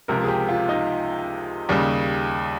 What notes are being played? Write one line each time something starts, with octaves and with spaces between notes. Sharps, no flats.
C#2 C3 F3 A#4
G#4
G4
F4
D#4
D#2 C#3 G3